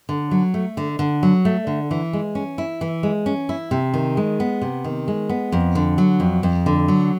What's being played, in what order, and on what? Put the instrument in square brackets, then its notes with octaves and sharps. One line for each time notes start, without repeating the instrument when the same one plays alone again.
[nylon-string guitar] D3
F#3
A3
D3
D3
F#3
A3
D3
E3
G#3
C#4
E4
E3
G#3
C#4
E4
C3
D#3
G#3
B3
C3
D#3
G#3
B3
F2
D3
F#3
F2
F2
D3
F#3